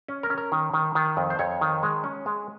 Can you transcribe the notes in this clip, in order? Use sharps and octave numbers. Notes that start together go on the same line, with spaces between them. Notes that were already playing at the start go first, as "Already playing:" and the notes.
C#4
A#4
C#4
A#4
D#3
D#3
D#3
F2
C5
F2 C#5
D#3
G#3
C#4
G#3